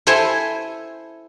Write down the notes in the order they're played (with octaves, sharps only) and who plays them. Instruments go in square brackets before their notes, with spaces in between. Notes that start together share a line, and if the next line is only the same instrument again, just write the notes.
[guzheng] E4 A4 C5 G#5 A5